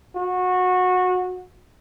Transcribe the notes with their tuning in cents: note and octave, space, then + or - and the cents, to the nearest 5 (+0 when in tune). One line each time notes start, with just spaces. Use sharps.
F#4 -20